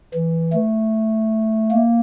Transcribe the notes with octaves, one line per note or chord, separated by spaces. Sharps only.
E3
A3
A#3